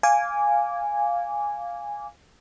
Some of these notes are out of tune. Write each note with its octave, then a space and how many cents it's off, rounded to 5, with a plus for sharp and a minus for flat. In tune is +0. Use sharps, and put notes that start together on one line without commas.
F5 +0 G#5 -10 D6 -20